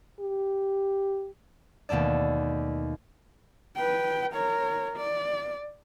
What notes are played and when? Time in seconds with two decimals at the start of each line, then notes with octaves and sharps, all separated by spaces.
0.20 G4
1.89 D#2 B2 A3 A4 D5
3.76 B4 G5
4.34 A#4 C#5
4.97 D5